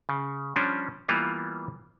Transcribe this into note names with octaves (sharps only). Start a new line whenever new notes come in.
C#3
F3 G3 C#4 D4
E3 G3 A#3 B3 F4